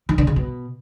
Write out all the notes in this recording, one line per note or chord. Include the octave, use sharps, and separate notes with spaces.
D#3
D3
C#3
B2